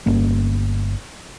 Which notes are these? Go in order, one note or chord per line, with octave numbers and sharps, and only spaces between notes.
G1 A#3 C#4